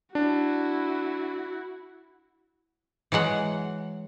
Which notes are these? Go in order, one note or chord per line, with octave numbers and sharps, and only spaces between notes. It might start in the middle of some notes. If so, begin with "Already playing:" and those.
D4 E4 F#4
E3 F#3 G#3 F#5